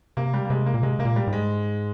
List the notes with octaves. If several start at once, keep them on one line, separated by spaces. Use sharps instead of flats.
C3 A#3
G3
A#3
C3 G#3
A#3
A#2
C3 G#3
C3 A#3
A#2
G3
G#2
G#3